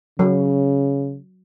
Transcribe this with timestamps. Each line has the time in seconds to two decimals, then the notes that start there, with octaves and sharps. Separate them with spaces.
0.19 C#3 F#3